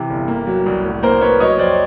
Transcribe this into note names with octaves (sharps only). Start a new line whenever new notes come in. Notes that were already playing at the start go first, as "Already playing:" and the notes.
Already playing: C3 E3
G1
A#3
F#3
C2
A2
A#3 A#4 C5
A#3 B4 C#5
F#3 C#5 D#5
F2 C5 D5